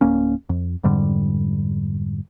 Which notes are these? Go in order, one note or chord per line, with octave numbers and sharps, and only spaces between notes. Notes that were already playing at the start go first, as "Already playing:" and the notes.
D1 A#3 C#4
F2
F2 G#2 D3 G3